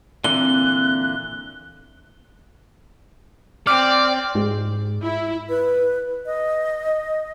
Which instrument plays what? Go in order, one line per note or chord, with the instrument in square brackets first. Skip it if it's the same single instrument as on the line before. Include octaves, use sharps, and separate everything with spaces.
[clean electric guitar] A#2 D3 E3 [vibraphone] C4 [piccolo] F#6 [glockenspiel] G7
[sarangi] C4 [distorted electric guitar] D5 [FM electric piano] D6 F6
[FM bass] G#2 [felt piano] G#3
[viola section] E4
[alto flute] B4
D#5